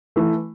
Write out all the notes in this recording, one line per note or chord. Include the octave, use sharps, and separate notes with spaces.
E3 A3